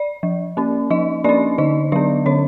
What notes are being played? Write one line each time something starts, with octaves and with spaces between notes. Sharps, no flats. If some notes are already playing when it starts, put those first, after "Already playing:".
Already playing: D5
F3
A#3 C#4
F3 D#4 D#5
A#3 C#4 D4 D5
D3 D#4 D#5
F#3 B3 D4 D5
D3 C#4 C#5